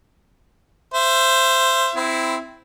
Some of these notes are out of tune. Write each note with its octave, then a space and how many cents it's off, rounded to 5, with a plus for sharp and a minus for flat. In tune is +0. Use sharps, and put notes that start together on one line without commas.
C5 +0 E5 +30
C4 -15 E4 +0